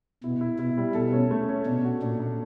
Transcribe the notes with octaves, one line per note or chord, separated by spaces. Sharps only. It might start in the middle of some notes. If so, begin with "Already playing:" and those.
B2 E4
E4
B2 E4
G3
B2 A4
C#4
A3
C#4
B2 D4
F#4
A#2 D4
D4